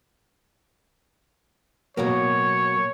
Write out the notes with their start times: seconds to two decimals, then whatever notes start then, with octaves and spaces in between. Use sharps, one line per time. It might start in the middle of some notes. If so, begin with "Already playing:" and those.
1.97 B2 F#3 A#3 C#5